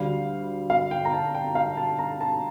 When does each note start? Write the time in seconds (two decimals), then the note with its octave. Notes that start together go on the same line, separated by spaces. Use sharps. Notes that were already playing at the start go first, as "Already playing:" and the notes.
Already playing: D2 D3 G3 F5
0.70 F5
0.91 G5
1.05 A#5
1.13 A5
1.35 G5
1.55 F5
1.77 A5
1.99 A#5
2.21 A5